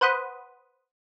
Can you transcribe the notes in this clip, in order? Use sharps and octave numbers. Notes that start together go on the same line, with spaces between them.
B4 C5 F#5 B5 D#6